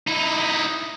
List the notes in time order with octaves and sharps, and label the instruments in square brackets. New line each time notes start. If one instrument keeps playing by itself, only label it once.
[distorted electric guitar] D#4 E4